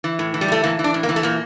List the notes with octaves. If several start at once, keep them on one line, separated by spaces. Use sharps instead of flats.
E3
A2
E3
G3
A2 A3
E3 A#3
E3
D4
A2
A#3
E3
A3
A#2 A#3